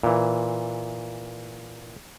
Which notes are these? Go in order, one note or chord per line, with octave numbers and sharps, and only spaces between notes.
A#2 E3